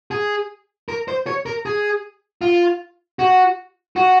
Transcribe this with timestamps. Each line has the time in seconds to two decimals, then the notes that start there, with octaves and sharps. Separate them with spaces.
0.11 G#4
0.89 A#4
1.08 C5
1.27 C#5
1.46 A#4
1.66 G#4
2.41 F4
3.19 F#4
3.96 F#4